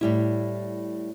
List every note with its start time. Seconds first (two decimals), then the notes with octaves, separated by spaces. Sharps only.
0.01 A2 G3 E4